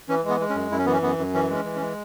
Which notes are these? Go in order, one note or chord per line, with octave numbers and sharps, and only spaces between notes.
E3 C#4
G#3
B3
G#3
C#4
F#2
F#2 E4
C#4
E3 B3
C#4
F#2 B3
F#2
E3 C#4
G#3 C#4
E3
C#4
G#3